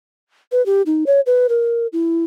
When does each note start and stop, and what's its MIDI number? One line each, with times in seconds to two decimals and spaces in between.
0.52 0.64 71
0.66 0.82 67
0.86 1.04 63
1.06 1.21 73
1.26 1.47 71
1.49 1.87 70
1.93 2.25 64